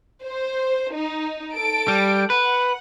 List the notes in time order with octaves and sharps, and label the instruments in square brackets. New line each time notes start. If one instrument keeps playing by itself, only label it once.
[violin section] C5
D#4
A4 D7
[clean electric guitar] G3
[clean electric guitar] B4 [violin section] F#5